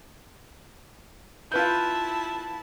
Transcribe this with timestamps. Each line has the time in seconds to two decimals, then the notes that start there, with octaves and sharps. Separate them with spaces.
1.52 E4 F4 B4 A5 G6